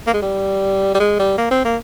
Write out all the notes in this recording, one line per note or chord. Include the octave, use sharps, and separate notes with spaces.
A#3
G#3
G3
G3
G#3
G3
A#3
C4
A#3